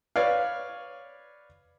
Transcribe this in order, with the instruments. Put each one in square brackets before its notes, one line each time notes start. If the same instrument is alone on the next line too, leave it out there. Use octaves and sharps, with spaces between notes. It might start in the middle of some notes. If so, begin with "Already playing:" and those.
[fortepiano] B4 C#5 D5 F5